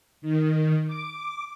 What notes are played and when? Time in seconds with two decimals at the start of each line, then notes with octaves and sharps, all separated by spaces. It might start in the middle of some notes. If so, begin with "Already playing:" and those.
0.22 D#3
0.87 D6